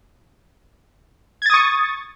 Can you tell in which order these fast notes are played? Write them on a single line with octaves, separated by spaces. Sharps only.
G#6 A6 D#6 C#6